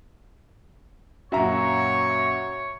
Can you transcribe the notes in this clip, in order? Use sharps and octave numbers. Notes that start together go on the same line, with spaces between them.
F#2 A#2 F#4 C#5 E5 A#5